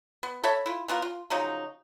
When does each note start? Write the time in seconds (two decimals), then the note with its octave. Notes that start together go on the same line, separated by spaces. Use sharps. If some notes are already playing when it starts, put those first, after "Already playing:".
0.23 B3
0.44 A4 C#5 E5 B5
0.66 E4 F4
0.88 E3 B3 F4 A#4
1.02 F4
1.30 C#3 F3 F#3 D#4